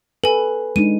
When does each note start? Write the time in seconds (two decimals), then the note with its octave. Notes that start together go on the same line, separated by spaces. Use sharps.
0.24 A4 B4 G#5
0.76 G#3 D4 D#4 D#7